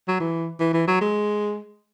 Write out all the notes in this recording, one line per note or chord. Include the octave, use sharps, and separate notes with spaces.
F#3
E3
E3
E3
F#3
G#3